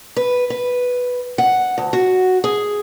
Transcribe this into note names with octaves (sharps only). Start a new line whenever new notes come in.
B4
B4
F#5
D2
F#4
G#4